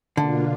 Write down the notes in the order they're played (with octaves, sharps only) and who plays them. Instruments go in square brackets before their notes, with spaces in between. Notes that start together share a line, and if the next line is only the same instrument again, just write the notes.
[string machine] B2 A#3 D4 F4 [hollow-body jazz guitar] D3